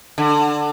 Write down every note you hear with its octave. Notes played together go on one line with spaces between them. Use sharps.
D3